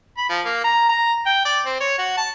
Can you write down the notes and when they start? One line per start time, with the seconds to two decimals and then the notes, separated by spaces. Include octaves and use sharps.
0.18 B5
0.30 F3
0.45 A#3
0.64 A#5
0.89 A#5
1.26 G5
1.45 D5
1.66 C4
1.80 C#5
1.99 F#4
2.17 A5